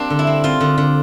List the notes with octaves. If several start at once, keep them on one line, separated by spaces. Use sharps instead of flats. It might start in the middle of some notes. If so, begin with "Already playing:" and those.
Already playing: G3 A#3 C4 D4
D3
E4
C4
C4 F4
D3
D3